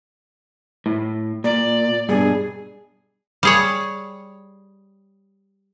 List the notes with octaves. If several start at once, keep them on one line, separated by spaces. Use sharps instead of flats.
A2
A#2 D5
G2 B2 D4 G#4
G3 G#4 C#5